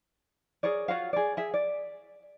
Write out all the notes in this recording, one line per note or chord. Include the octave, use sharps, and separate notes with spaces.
G#4 A#4 C#5 D5
F4 F#4 C#5 F5
G#4 D5
G#4 E5
D5